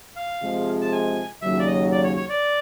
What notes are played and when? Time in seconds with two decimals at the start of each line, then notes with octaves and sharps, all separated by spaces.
0.16 F5
0.42 C3 F3 G#3
0.81 A5
0.92 G#5
1.41 D#2 C#3 F#3 E5
1.59 D5
1.66 D#5
1.92 D5
2.04 C#5
2.16 C#5
2.29 D5